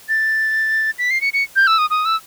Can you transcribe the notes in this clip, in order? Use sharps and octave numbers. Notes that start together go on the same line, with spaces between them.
A6
B6
C7
C#7
C#7
G6
E6
D#6
D#6
E6